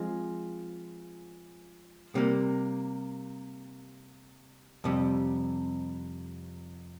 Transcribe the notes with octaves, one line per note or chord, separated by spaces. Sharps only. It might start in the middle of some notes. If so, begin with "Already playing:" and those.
Already playing: F3 G#3 C4
C3 G3 A#3
F2 C3 G3